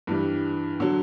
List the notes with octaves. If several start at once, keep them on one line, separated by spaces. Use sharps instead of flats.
G2 E3 G3
D3 F#3